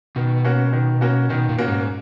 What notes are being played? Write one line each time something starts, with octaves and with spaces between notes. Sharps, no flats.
B2 D#3
A#3 C#4 F#4
D#3
A#3 C#4 F#4
B2 D#3
A#2
A#3 C#4 F#4
G#2